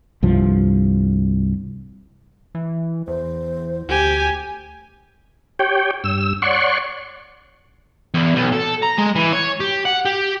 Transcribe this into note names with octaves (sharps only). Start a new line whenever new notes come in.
C2 G2 F3
E3
E2 C5
D2 G4 G#5
G4 C#5 G5
G2 E6
C#5 D5 F#5 C6 C#6
E2
B1
A4
A#5
G#3
E3
C#5
G4
F#5
G4